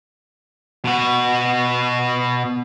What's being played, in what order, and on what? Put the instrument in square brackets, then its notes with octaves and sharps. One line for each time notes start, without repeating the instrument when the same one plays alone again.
[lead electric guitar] B2 F#4